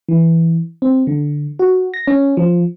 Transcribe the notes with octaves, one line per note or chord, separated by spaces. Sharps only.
E3
C4
D3
F#4
A#6
C#4
F3